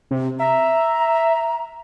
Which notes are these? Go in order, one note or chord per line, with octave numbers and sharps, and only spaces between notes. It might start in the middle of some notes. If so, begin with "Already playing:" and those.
C3
E5 A#5